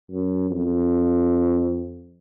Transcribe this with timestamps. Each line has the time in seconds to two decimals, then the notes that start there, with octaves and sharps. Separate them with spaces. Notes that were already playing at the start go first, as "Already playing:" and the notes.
0.11 F#2
0.51 F2